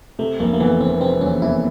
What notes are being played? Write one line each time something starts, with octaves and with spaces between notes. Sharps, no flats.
C3 A3
F1 A#3
A#3
E3 B3
E3 C4
C3 C4
E2 C#4
E3 E4